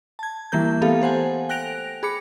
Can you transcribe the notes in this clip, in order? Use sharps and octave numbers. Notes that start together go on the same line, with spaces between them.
A5 G#6
E3 G3 A#3 A#4 G6
A3 B3 G4 A4 F5
A4 C5 F#5 G#5
G5 F#6 A#6 D7 F7
G#4 B5 D6 C#7